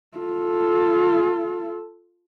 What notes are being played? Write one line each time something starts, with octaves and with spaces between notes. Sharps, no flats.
F4 A4